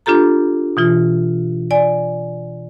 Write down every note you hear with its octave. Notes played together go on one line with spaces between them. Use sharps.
D4 F4 G4 A4 A#5
B2 E3 F4
D5 G#5